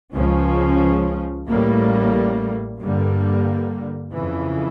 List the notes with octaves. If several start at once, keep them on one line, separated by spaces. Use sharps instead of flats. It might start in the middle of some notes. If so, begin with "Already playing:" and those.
C#2 C#3 F3 C#4
A1 A2 G3 A#3
G2 D3 G3 A#3
F2 C#3 E3